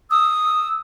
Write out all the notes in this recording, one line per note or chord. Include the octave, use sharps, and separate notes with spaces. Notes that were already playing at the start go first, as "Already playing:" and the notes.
D#6 E6